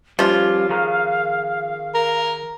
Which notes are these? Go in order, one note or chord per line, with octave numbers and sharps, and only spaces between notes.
F3 G3 C#4 F4 F5
D#3 G#4 A#5
A#4